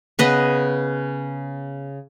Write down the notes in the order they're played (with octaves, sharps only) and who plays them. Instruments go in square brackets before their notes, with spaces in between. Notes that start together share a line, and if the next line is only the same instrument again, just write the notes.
[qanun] C#3 B3 B4 D#5